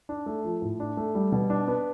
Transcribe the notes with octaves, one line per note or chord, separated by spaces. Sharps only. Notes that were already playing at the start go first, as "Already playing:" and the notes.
D4
A3
F3
A2
D4
A3
G3
B2
D4
B3